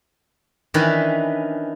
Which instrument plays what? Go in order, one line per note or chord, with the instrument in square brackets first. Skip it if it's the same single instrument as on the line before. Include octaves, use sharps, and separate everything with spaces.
[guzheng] D#3 E3 C#4 D4 B4 B5